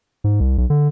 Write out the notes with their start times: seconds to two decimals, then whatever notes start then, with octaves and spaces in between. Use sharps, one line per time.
0.24 G#2
0.40 C2
0.58 B1
0.70 D3